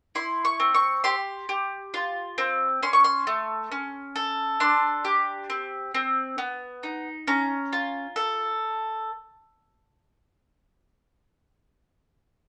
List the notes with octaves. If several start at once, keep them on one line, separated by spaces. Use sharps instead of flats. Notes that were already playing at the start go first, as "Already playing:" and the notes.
E4 C6
C#6
C4
C#6
G4 C6
G4
F4
C4
C#4 C6
C#6
C6
A3
C#4
A4
D4 C6
G4
C4
C4
B3
D#4
C#4 A#5
F4
A4